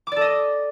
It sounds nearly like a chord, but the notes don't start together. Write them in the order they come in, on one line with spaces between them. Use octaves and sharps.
D6 D5 A4 D#5